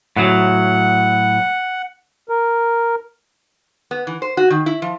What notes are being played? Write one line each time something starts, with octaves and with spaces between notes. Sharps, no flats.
A2 F#3 F#5
A#4
B3
E3
C5
F#4
D#3
E4
F3